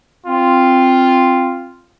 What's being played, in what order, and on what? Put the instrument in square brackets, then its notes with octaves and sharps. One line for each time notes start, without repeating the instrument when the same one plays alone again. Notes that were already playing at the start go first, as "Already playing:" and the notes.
[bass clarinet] C4 [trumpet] F4